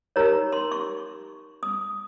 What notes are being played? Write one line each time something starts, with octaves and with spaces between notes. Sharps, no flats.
D#4 G4 A#4 C#5 A#5
C6
C#6
D#6